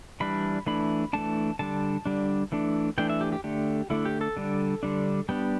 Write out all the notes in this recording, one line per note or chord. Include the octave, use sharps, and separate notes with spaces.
E3 G3 D4 B5
E3 A3 D4 B5
E3 A3 D4 A5
D3 G3 D4 A5
D3 G3 D4
E3 A3 D4
E3 A3 D4 G5
E5
G4
G4
D3 A3 D4 G4
D3 A3 D4 E4
G4
A4
D3 G3 D4
D3 G3 D4
G3 B3 D4 G4